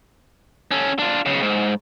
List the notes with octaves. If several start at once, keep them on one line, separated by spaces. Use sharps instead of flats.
C#4 A4
D4 F4
B1 C#3
G#2